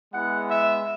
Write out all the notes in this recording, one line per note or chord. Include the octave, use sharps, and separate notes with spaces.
G#3 B3 E4 F#5
E5